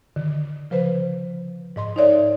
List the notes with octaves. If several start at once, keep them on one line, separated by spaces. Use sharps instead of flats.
D3 D#3
C#3 F3 B4 C5
G#2 D#5 C6
D#4 A#4 C#5 D5 E5